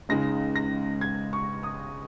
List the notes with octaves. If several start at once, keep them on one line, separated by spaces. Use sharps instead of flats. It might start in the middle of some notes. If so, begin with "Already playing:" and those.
C#2 C#3 G#3 D#4 A#6
A#6
G#6
C#6
D#6